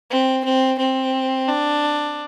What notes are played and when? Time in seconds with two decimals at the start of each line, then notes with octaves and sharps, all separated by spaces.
0.10 C4
0.45 C4
0.79 C4
1.48 D4